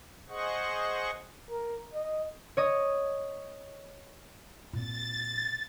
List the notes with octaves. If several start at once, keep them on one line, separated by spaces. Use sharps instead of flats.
G#4 C5 D#5 F#5 C#6
A#4
D#5
C#5 D#5 D#6
A#2 C4 A6